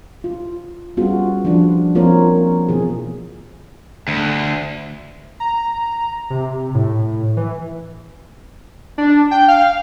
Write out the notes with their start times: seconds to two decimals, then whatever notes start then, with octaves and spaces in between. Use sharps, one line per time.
0.24 F4
0.97 G3 B3 C#4 F4 F#4 G#4
1.45 F3 D4 F4
1.95 F3 A#3 C4 F4 A#4 C#5
2.69 B2 E3 G#4
4.08 D2
5.40 A#5
6.30 C3
6.74 A2
7.37 E3
8.98 D4
9.31 G5
9.48 F5